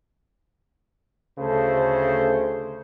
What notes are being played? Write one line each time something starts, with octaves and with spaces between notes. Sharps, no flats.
D2 C#3 A3 A4 C5